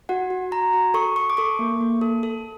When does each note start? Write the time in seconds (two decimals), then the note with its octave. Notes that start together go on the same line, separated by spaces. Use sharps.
0.09 F#4 F#5
0.30 F#4
0.51 F#4 A#5
0.74 F#4
0.94 A4 C#6
1.16 A4 C#6
1.30 D6
1.37 A4 C#6
1.59 A#3
1.80 A#3
2.01 A4
2.23 A4